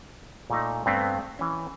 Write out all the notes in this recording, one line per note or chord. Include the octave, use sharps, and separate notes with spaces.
A#2 A3 D#4
G2 A3 B3 C4
E3 C#4